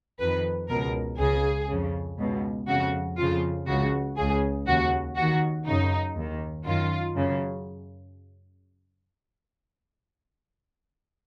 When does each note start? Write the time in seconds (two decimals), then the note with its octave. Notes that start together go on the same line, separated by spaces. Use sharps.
0.20 F2 D#3 B4
0.69 C#2 B2 A#4
1.19 C#2 C#3 G#4
1.69 F2 C#3
2.18 C#2 B2
2.68 F2 C#3 F#4
3.18 F2 C#3 F4
3.67 C#2 C#3 F#4
4.17 C#2 C#3 G#4
4.67 D#2 C#3 F#4
5.16 D#2 D#3 F#4
5.67 F#2 C#3 D#4
6.16 D#2 D#3
6.66 F#2 D#3 F4
7.15 F#2 C#3